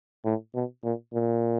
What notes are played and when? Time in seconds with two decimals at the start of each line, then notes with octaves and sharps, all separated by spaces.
0.25 A2
0.55 B2
0.84 A#2
1.14 A#2